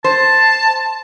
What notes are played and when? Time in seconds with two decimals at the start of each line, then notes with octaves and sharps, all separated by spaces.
0.04 C5 A5